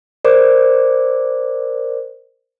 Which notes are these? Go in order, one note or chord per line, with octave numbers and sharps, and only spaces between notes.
A#4 C5 D5 D6